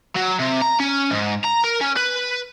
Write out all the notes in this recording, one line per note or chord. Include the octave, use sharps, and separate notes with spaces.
F#3
C3
A#5
C#4
G#2
A#5
A#4
C#4
B4